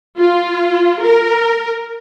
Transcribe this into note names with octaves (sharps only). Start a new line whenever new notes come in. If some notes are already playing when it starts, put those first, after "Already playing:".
F4
A#4